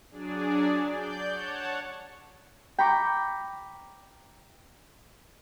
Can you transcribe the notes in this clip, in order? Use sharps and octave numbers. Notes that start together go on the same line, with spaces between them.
F#3 D4 G#4 D5
D5 G6
C#5 F#5 A5
G5 A#5 B5 C#6 D6